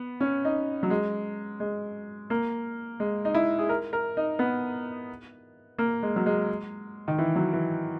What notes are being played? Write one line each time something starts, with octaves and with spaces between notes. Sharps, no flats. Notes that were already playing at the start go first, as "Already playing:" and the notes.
Already playing: B3
C#4
D#4
F#3
G#3
G#3
A#3
G#3
D#4
E4
G#4
A#4
A#4
D#4
B3
A#3
G#3
F#3
G#3
D#3
E3
F#3
E3